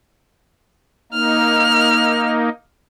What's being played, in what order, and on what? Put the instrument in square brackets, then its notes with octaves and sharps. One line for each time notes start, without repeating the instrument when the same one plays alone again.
[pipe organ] A#3 D#4 [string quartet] F6